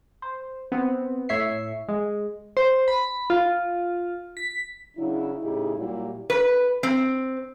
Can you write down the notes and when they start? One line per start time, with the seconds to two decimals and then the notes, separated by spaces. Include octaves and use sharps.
0.22 C5
0.72 B3 C4
1.29 A2 C#5 E5 C7
1.89 G#3
2.57 C5
2.88 B5
3.30 F4
4.37 B6
4.97 C#3 F#3 D4 E4
5.42 A2 C#3 D#4 E4 G4 G#4
5.77 A#2 F#3 G3 E4 F#4 G4
6.30 B4
6.83 C4